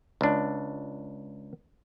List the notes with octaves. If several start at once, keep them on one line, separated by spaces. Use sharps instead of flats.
C#2 D4